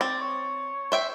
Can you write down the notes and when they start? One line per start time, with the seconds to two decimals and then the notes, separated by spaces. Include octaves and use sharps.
0.01 C4 D5
0.20 C#5
0.92 C5 E5 G5